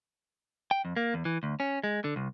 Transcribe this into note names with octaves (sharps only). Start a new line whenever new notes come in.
G5
F2
A#3
E2
E3
D2
C#4
G#3
D3
C2